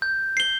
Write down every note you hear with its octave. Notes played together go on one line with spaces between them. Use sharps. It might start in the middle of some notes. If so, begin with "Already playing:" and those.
G6
C7 G7